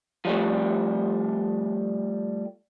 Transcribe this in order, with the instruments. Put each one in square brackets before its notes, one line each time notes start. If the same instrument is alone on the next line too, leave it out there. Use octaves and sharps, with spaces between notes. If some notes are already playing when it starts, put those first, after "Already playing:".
[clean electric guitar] F3 G3 A3